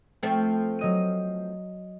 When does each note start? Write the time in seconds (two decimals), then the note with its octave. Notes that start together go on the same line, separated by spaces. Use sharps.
0.23 F3 A3 C4
0.79 F#3 D#5 D#7